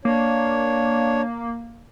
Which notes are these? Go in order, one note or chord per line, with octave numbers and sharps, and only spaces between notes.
A#3 D4 C#5